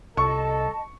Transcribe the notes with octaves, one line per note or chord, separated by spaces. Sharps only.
C2 A4 D#5 A5 C#6